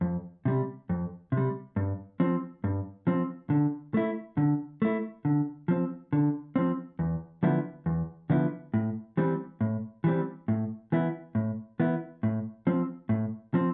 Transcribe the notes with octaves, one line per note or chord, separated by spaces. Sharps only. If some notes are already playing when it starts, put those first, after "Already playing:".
F2
C3 G3
F2
C3
G3
G2
F3 C4
G2
F3 C4
D3
A3 E4
D3
A3 E4
D3
F3 C4
D3
F3 C4
E2
D3 F3 B3 E4
E2
D3 F3 B3 E4
A2
E3 G3 C4
A2
E3 G3 C4
A2
E3 B3 E4
A2
E3 B3 E4
A2
F3 C4
A2
F3 C4